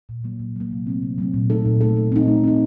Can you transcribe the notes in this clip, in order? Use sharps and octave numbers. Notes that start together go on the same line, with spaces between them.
A#2
F#3 A#3
A#2
F#3 A#3
C3
F#3 A3 C4
C3
F#3 A3 C4
A#2
A3 D#4 A4
A#2
A3 D#4 A4
A3
C4 D#4
A3
C4 D#4